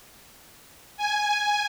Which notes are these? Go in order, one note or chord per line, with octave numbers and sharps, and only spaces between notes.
G#5